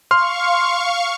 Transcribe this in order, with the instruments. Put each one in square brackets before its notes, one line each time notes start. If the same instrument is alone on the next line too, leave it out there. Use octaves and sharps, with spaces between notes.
[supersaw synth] F5 C#6 [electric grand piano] C6 F6